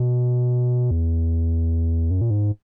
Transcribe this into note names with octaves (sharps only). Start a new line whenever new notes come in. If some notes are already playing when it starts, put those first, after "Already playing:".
Already playing: B2
E2
F#2
A#2
G#2